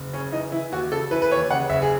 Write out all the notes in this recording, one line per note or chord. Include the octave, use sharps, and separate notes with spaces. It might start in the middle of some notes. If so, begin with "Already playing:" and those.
Already playing: F#1
C#3 C#4
E3 D#4
E3 E4
D#2 F#4
C#3 A4
E3 B4
B4
D#2 C#5
C#3 F#5
F#1 E5
G#4